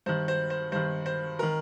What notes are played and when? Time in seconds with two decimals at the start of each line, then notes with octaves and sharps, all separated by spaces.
0.06 G2 D#3 C5
0.28 C5
0.50 C5
0.72 G2 D#3 C5
1.06 C5
1.39 D#3 A#4